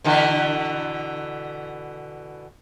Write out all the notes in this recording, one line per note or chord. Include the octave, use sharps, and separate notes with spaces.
B2 D3 E3